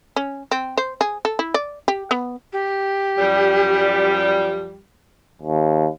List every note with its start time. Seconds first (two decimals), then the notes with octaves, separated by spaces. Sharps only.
0.16 C#4
0.51 C4
0.77 C5
1.01 G#4
1.25 A4
1.39 E4
1.54 D5
1.88 G4
2.11 B3
2.53 G4
3.18 F#2 F3 G3
5.42 D#2